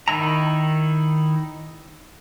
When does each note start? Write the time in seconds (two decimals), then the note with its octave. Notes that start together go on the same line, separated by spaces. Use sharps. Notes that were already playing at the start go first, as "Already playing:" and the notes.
0.08 D#3 D#4 E4 A#5